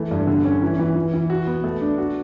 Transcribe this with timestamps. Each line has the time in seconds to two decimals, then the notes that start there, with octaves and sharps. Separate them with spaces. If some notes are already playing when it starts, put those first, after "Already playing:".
Already playing: E3 A3
0.11 G2
0.27 D3
0.45 C#4
0.62 E3
0.79 E3
0.95 E3
1.13 E3
1.30 F#4
1.47 B3
1.64 A3
1.81 D4
1.98 F#4